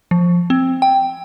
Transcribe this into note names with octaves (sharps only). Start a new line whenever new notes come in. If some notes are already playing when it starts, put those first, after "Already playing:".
F3
C4
G5